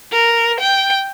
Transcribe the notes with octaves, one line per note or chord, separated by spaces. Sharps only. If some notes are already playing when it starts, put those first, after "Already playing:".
A#4
G5